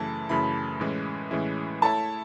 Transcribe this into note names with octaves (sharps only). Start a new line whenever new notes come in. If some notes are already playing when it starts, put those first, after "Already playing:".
Already playing: F#2 C#3 E3 A3 E4 A5
F#2 C#3 E3 A3 E4 B5
A2 E3 G#3 C#4 E4
A2 E3 G#3 C#4 E4
A3 E4 A4 C#5 E5 A5